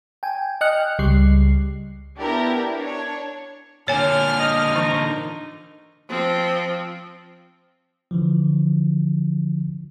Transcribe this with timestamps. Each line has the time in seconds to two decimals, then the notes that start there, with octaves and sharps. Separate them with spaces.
0.23 G5 G#5
0.61 D#5 G5 F6 F#6 C#7
0.99 C#2 G3 C7
2.18 B3 D4 E4 G4 A#4
2.75 D4 C#5
3.88 A#2 D3 C#5 G#5 F6
4.40 D#5
4.76 E3 D#4
6.08 F3 C4
8.11 D3 E3 F3